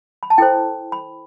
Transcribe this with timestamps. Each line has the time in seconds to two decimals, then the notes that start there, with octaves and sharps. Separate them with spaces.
0.23 B5
0.30 A5
0.38 E4 A4 C5 G5
0.92 B5